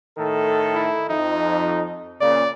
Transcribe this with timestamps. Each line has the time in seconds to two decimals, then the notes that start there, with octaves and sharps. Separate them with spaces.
0.18 A2 D#3 A4
0.75 E4
1.09 F2 D#4
2.21 A#2 C#3 D5